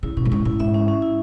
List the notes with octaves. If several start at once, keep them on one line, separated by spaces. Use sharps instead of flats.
C#3 E4
B2 C#4
A2
G#2 C#4
A2 E4
G#2 E5
C#4
C#4
E4